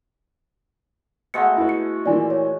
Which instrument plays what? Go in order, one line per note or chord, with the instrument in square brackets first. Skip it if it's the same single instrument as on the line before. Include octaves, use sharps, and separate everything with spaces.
[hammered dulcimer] B2 G#3 A3 [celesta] F#5 C#7
[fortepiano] E4 B4
[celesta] C#7
[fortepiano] A#2 E3 A#3 [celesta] D5 G#5
[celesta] C#5